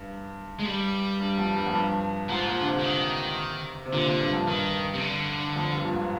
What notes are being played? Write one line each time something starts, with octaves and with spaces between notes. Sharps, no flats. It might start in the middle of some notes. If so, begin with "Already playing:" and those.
Already playing: G2
G#3
G3
G2
F2
G2
F2
G2
G#2 F3
A#2
D3
C3
D3
D#3
C3
A#2 D3
A#2
G2
F2
G2 D#3
C3
D3
F2
G2
A#2
G#2